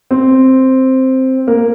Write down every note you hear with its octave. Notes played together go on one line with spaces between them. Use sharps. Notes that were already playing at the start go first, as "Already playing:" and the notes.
C4 C5
A#3 A#4